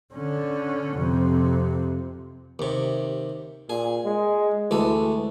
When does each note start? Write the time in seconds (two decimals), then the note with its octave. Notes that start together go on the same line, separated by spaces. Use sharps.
0.14 D3 C#4
0.97 F2 C3
2.59 D#2 C3
3.70 A#2 G#4
4.05 G#3
4.71 D2 E3 G#3 A4